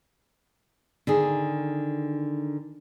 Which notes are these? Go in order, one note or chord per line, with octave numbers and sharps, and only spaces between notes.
D3 D#3 G#4